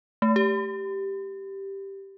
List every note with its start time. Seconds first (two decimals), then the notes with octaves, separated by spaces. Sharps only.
0.22 A3
0.36 G4